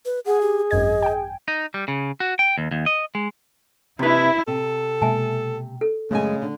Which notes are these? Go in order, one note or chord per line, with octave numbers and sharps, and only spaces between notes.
B4
G#4 F#5
G4
G#1 F#2 D#5 G#6
G5 G#5
D#4
G3
C#3
F#4
G5
D#2
D#2
D#5
G#3
C3 E4 B4
C3 A4
B2 G#3 A#3 E5 G#5 A5
A4
F#2 C#3 G#3 A3 G#5
D3